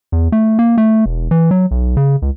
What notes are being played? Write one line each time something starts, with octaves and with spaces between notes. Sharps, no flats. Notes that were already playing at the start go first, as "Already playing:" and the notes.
E2
A3
A#3
A3
E1
E3
F#3
B1
C#3
C#2